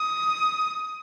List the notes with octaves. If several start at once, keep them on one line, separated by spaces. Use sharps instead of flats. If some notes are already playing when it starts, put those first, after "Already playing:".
Already playing: D#6